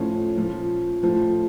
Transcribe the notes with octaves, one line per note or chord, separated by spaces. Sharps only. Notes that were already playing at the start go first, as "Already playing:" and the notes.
Already playing: A2 F3 C#4
A#2 F3
A2 F3